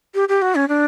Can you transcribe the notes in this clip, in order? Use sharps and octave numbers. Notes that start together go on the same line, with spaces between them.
G4
G4
F#4
C#4
D4